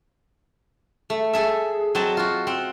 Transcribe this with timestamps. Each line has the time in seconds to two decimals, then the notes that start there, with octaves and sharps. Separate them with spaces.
1.10 A3
1.33 G#4 A4 E5
1.95 F#3 C4 D#5 A5
2.17 F4 F#4
2.47 C4 F#5